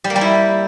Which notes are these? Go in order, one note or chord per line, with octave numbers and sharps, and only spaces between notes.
G3
A#3
G3
E4